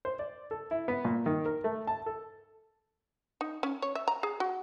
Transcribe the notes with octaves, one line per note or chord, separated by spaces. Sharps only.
C5
D5
A4
E4
B3
A#2
D#3
A#4
A3
A5
A4
D#4
C#4
C#5
E5
A#5
G#4
F#4